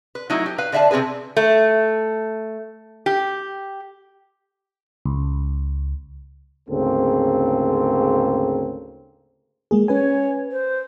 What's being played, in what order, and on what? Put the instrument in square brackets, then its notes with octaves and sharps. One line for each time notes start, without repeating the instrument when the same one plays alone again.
[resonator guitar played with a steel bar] B4
F#3 A3 D#4 E4
G4
B4 F5
D3 D5 E5 F5 A5
C3 E3 C4 G#4 B4
A3
G4
[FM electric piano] C#2
[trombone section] D2 G#2 C#3 A#3 C4 A4
[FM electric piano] G#3 A#3 G#4
[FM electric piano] C#4 B4 G#5 [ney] C#5
[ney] C5